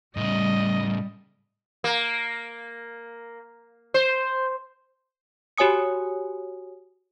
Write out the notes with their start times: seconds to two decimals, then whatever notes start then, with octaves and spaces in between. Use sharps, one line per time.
0.17 A2 C#3 G3 D#5
1.84 A#3
3.94 C5
5.58 F#4 G4 C#5 G#5 D#6 C#7